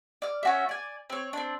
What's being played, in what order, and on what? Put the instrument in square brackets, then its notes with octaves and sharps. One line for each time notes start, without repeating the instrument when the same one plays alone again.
[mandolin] D5 F6
C#4 F#4 E5
D5 G#5
C4 C#5
C4 D4